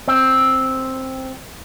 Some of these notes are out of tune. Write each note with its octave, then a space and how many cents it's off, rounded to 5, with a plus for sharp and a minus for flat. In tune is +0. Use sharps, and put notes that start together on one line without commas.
C4 +5